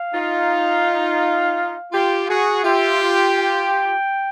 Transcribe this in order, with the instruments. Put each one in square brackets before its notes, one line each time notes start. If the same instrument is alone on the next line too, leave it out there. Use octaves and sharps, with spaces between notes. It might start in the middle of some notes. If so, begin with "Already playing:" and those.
Already playing: [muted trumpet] F5
[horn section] D#4 F4
F4 G4
F#4 G#4
[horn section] F4 G4 [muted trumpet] E5
[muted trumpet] G5